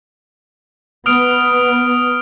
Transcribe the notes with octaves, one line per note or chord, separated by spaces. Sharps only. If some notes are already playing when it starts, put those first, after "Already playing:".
B3 D#6 F6 D7